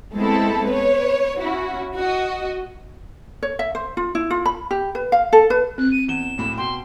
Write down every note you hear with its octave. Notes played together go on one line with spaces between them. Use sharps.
G#3 A3 B3 C4 E4 A4
B4 C#5
C#4 E4 F#4
F#4 D#5
C#5
E5
C5
F4
E4
F4
B5
G4
B4
F5
A4
B4
C4 F#6
D#7
E2 E7 G7
D1 A2 B5
B2 G5 C6